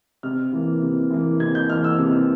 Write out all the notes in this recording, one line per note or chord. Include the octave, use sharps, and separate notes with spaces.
C3 F6
E3 A#3
C3
E3 A#3
C3 G#6
G6
E3 A#3 F6
E6
C3